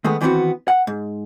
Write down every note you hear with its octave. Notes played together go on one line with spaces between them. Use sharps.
D#3 G#3 A3 B3
D#3 E3 A3 B3 C4 F#4
F#5
G#2